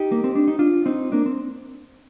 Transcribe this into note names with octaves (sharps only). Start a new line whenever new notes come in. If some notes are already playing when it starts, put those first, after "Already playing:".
Already playing: D#4 G4
A#3
C4
D4
D#4
D4 F4
C4 D#4
A#3 D4
C4